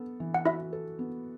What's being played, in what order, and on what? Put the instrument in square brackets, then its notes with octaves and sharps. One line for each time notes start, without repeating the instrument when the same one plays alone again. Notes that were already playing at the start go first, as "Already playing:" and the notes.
Already playing: [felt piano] B3 A4
E3
[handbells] F#5
[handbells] E4 E5 [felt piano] F#4
[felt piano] A4
B3